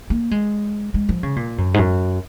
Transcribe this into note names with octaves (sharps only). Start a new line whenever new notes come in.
A#3
G#3
G#3
F3
C#3
A#2
F#2
G#2
F#2